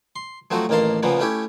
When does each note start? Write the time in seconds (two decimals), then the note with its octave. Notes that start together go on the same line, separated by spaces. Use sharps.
0.16 C6
0.51 F3 F#3 A3 C4 F#4
0.69 A1 D#2 A#3 A#4 A5 C6
1.03 A#2 C#3 F3 A#3 B3
1.19 A3 C#4 E4 G4